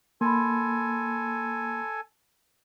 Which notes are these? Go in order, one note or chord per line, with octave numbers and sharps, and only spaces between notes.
A#3 A4 G#5 B5 C6